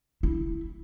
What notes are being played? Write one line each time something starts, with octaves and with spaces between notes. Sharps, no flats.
E4